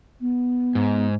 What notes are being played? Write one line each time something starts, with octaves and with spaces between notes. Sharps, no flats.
B3
G#2